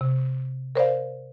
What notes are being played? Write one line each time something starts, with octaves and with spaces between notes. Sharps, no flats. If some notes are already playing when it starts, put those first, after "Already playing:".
C3
A#4 C5 D5 F5